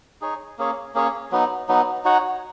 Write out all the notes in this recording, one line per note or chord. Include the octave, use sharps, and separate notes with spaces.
D#4 G#4 C#5
A#3 C#4 G#4 C#5
A#3 C#4 G#4 C#5
F#3 B3 D#4
F#3 B3 D#4
D#4 F#4 C#5 F#5